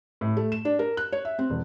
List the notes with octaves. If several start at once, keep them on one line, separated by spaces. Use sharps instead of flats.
A2
A3
E7
D4
A#4
F#6
C#5
E5
C4
E1